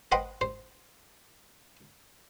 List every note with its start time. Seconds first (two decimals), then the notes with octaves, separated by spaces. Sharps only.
0.12 B4 C5 D#5 F#5 G5 C6
0.41 C5